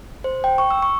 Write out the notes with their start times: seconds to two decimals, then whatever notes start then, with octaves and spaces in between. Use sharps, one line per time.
0.24 C5
0.44 G5
0.58 C#6
0.71 E6
0.82 C#6